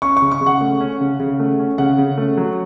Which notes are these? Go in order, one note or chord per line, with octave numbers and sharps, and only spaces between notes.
C#4 C#6
C#6
C#3
C#6
C#3
F#5
A3
C#4
C#3
C#3
A3
C#4
C#3 F#5
C#3
A3
F#3